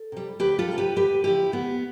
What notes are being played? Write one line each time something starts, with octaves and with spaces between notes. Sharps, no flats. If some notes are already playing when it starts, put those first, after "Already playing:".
Already playing: A4
C3 G3
D2 G4 B4
F4 A4
C3 G3
G4 B4
D2 G4 B4
D3 F3 E4 G4
D2 B3